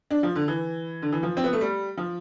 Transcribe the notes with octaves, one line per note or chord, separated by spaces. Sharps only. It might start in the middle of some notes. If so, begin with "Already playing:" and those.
D4
F3
D3
E3
D3
E3
F3
C4
B3
A3
G3
F3